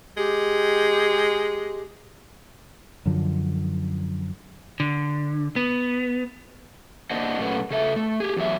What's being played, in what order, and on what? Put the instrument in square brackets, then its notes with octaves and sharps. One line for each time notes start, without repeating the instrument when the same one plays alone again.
[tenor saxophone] G#3 [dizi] G4
[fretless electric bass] F#2 D3 F3
[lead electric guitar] D3
B3
[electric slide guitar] A#3 D4 C5 D#5 F#5
F#2 A#2 A3 C#4 B4 F#5
C#3 A4 E5
A3
G4 G#4
E2 F#3 E5